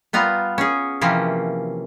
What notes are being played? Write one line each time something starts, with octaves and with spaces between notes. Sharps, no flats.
G3 B3 F4 A#5
C#4 G#4
C3 E3 F3 A#3 C#4